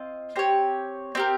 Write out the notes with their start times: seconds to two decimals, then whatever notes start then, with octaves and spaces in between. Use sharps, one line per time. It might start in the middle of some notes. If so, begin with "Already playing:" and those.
Already playing: C4 F4 D#5
0.36 C4 G4 C#5
1.15 C4 G4 A#4